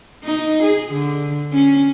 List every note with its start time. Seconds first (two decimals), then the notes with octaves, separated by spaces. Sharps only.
0.24 D#4
0.63 G#4
0.92 D3
1.53 C#4